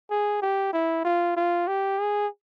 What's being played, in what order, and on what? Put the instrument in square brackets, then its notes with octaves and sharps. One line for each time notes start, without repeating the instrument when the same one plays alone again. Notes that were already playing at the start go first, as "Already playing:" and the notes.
[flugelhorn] G#4
G4
E4
F4
F4
G4
G#4